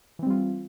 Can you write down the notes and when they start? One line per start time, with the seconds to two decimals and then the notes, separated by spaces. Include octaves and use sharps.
0.19 E3
0.23 C4
0.26 G3
0.30 F4